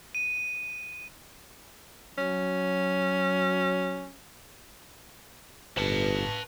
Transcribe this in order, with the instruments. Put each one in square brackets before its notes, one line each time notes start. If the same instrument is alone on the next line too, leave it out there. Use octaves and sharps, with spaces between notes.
[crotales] D#7
[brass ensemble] F#3 [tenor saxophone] C#4
[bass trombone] G1 [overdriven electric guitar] B4 A5